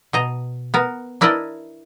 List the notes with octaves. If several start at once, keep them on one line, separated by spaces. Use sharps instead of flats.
B2 D#5 A#5
B3 A#4
D4 E4 A#4 B4 D5 D#5